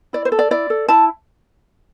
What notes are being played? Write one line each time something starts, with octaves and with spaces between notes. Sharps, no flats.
E4 D5
C5
A4
D5
E4 D5
A4
E4 A5